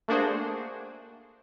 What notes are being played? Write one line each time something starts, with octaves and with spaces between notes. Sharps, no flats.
A3 A#3 D4 F#4 G#4 C5